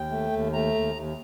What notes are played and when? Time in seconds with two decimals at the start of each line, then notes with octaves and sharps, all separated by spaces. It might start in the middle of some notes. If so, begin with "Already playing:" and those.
Already playing: D#2 G5
0.10 A3
0.32 D#2
0.53 A3 A#5
0.74 D#2
0.96 D#2